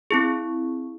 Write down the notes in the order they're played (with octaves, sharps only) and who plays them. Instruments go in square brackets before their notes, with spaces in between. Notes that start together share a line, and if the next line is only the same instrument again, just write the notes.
[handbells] C4 E4 G#4